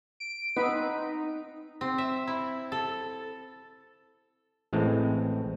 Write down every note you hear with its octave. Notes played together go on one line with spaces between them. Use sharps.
D7
B3 C4 D#4 B4
C4
E5
E4
A4
A1 A2 G#3 C4